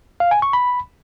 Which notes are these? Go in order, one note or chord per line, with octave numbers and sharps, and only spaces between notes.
F5
G#5
C#6
B5